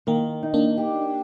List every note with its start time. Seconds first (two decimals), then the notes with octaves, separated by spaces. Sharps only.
0.07 D#3 A#3
0.43 D#4
0.54 A#3 D4
0.77 G4